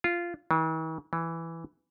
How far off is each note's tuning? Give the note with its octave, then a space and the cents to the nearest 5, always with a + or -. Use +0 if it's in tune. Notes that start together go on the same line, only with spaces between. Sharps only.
F4 -10
E3 -45
E3 +5